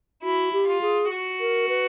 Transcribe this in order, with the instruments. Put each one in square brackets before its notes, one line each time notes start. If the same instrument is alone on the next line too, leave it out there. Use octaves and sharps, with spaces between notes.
[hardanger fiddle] E4 [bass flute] F#4
[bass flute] G4
[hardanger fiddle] F4
[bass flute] G#4
[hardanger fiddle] F#4
[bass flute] A#4
B4